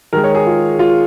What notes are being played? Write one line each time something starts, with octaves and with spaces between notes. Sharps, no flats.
D#3 G#3 A#4
C#5
G#4
F4
F4